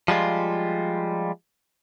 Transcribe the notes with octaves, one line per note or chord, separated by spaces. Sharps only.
F3 G3 G#3 F4